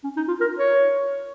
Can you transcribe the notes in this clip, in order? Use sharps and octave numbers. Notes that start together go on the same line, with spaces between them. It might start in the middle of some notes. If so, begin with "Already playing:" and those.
C#4
D#4
F4
A#4
C#5